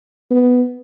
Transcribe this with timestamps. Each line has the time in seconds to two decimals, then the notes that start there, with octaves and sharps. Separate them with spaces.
0.31 B3